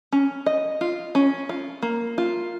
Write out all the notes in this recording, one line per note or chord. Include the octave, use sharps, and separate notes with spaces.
C#4
D#5
F4
C#4
F4
A#3
F4